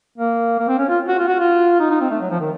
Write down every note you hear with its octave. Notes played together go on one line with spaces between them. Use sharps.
A#3
A#3
C4
C#4
F4
F#4
F4
F#4
F4
D#4
D#4
C4
A3
F#3
F3
D#3